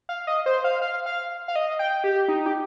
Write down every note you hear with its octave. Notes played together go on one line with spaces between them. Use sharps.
F5
D#5
C5
F5
F5
F5
F5
D#5
G5
G4
D#4
G4